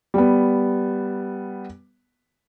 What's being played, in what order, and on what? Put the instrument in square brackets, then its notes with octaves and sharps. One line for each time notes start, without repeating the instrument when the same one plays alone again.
[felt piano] G3 B3